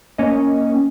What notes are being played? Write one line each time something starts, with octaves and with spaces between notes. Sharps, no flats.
A#3 C#4 D#5